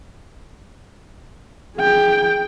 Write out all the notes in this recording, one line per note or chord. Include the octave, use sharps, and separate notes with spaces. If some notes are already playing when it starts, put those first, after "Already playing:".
G#4 G5